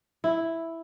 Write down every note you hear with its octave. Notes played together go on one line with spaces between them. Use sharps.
E4